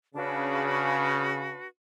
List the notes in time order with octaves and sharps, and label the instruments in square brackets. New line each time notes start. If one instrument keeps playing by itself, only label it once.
[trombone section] C#3 [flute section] D4 F#4 B4